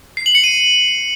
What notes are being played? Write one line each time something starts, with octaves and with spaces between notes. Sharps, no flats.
C7
F#7
C#7
D#7